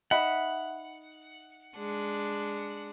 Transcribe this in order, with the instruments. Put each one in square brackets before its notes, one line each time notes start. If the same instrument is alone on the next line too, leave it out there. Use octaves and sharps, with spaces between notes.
[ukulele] D#4 E5 B5 [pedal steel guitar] F#5
[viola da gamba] G#3 D4